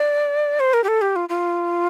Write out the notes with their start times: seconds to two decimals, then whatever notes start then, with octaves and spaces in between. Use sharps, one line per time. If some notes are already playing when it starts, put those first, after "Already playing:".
Already playing: D5
0.60 C5
0.74 A#4
0.84 G4
0.88 A4
1.01 G4
1.16 F4
1.29 F4